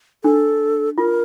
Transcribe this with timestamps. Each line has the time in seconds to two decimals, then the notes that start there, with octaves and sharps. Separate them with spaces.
0.24 D4 A4
0.98 F4 A#4